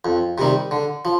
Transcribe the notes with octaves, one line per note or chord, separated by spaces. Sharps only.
F2
C3 D#3 G3
D3
F3